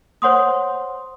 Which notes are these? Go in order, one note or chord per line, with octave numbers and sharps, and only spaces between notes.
C5 C#5 F#5 C6 D#6